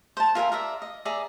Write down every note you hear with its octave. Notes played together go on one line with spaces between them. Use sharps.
C5 A5
F4 A#4 E5 G#5
A#4 D5 E5
D#5
G#4 D5 E5 A#5